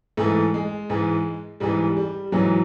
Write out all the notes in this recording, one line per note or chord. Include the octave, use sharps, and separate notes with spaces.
G#2 E3 A3
G#3
G#2 E3
G#2 E3 G3
G3
G#2 E3 F#3